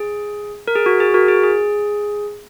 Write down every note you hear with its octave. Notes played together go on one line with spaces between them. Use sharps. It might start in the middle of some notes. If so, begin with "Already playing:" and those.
Already playing: G#4
A#4
G#4
F#4
G#4
F#4 A#4
G#4
G#4